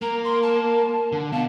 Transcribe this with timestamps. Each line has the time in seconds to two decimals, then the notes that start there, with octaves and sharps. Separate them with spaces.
0.02 A#3 A#4 A#5
0.24 C6
0.43 A5
1.12 D3
1.33 B2 F5 A5